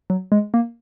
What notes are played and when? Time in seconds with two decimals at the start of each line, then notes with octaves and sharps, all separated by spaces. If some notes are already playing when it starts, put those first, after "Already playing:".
0.10 F#3
0.32 G#3
0.54 A#3